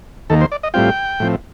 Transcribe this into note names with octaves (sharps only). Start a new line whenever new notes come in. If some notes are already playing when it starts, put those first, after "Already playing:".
D#2 D#3 A#3 A4
C5
D5
D#5
A2 G3 C4 F4 G5
A2 F3 C4